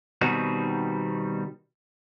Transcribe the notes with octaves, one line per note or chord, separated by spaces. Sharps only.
B2 D#3 G3 C4 D#4 F#4